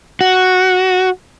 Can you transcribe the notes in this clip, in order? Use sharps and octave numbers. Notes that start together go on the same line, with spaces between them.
F#4